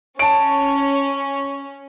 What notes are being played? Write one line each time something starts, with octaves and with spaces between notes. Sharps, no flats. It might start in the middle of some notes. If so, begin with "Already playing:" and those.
C#4 C#5 A5 D7